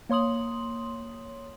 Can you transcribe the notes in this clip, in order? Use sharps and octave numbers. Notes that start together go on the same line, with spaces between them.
A#3 C#5 C6 D#6 F#7